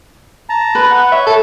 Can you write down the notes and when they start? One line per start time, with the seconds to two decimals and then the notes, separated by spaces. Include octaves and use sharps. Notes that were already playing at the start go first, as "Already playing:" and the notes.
0.49 A5 A#5
0.75 B4
0.91 F#5
1.12 C#5 E5
1.27 A4